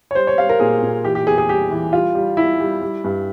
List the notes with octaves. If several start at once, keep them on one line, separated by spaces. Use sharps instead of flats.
C#5
G3 C5
C#5
G3 F5
A#4
A#2 G#4
A#2
E3 G4
G4
E2 G#4
G#4
G3 G4
E3
G3 F4
G3
G3 E4
G3
G3
G2